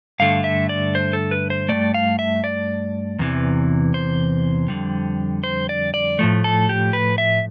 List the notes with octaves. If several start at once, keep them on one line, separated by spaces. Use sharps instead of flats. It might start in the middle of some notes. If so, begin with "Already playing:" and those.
G2 D3 A3 F5
E5
D5
C5
A4
B4
C5
G2 F3 A3 D5
F5
E5
D5
E2 C3 E3
C5
F2 D3 G3
C5
D5
D5
A2 F3 A3
A4
G4
B4
E5